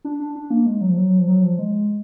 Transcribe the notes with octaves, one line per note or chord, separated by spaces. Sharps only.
D4
D4
D4
A#3
G#3
F#3
F3
F#3
F3
F#3
F3
G#3